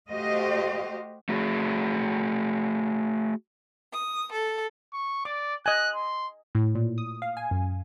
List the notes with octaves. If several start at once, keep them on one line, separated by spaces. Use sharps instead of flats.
A3 F#4 G4 C5 D#5 F5
A3 F#4 G#4
D#6
A4
C#6
D5 D6
D#5 G#5 F#6
C6
A2
A#2
D#6
F5
G#5
F#2